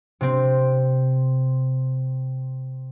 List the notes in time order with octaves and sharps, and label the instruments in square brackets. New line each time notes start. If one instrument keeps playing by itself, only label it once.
[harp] C3 C4